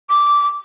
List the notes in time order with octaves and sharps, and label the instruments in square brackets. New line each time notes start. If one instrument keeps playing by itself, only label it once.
[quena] D6